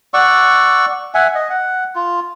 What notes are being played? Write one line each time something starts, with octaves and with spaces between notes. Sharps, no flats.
D5 F#5 C#6 E6
E5 F#5 G#5
D#5
F#5
F4